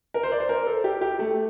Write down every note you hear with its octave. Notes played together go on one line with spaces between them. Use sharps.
A#4
C5
D5
C5
A#4
A4
G4
G4
A3